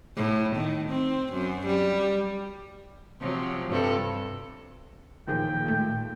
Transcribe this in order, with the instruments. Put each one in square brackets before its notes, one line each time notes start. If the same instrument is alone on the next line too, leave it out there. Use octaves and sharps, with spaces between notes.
[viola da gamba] A2
D#3
C4
F#2
G3
C3 F3 F#3
G2 C3 A4
[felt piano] D#2 [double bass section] A#2 [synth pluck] E3 F3 G#4 [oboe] G5
[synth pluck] G#3 A3